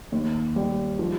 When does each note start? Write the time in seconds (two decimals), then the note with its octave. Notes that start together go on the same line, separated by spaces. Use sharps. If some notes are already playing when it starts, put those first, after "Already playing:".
0.12 D#2
0.56 G3
0.99 F3